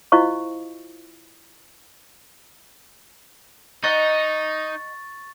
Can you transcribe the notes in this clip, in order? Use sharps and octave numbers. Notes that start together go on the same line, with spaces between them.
E4 F4 C5 D#5 F5 C#6
D#4 D#5 F#5 C#6 A6